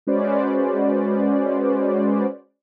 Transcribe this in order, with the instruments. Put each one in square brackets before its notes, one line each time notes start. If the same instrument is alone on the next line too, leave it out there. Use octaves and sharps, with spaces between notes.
[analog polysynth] G#3 C#4 F#4 B4 C5 D5